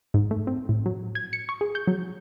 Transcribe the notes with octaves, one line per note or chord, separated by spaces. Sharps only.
G#2
A3
C4
A2
F#3
G#6
C#7
C#6
G#4
G6
F#3